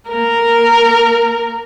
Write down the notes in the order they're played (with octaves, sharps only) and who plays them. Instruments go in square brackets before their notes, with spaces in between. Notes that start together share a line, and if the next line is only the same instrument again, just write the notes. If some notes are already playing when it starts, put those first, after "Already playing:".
[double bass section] A#3 [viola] A#4